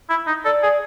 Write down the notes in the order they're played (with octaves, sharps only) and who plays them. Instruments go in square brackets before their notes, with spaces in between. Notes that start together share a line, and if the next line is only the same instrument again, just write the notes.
[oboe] E4
D#4
[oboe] A4 [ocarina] D5
[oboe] G#4